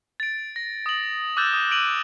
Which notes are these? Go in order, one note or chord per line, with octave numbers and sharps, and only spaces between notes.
A6 D7
A#6
D#6 F#7
D6 E6 F#6 G6 A6 E7
D#6
D7 D#7 F#7